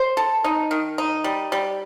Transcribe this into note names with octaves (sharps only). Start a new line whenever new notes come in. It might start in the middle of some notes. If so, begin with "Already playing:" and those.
Already playing: C5
A4
D#4
D#3
D#4
G3
G3